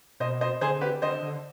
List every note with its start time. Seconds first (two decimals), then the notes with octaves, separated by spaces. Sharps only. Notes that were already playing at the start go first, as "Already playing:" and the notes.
0.20 B2 C5 D#5
0.41 C5 D#5
0.61 D3 G#4 C5
0.81 G4 B4
1.02 D3 C5 D#5
1.22 D3